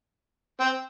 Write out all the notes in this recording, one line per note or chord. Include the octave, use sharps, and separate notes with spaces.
C4